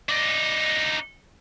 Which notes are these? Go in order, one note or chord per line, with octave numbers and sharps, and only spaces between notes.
D4 D#4